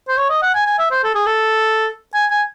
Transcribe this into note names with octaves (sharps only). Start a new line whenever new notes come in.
C5
C#5
D#5
F#5
G#5
G#5
E5
C5
A4
G#4
A4
G#5
G#5